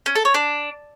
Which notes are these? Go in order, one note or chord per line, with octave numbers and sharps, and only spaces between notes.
C#4
A4
C#5
D4